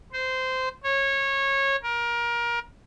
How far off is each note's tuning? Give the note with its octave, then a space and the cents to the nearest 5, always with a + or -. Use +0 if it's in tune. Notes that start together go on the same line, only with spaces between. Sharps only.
C5 -15
C#5 -20
A#4 +25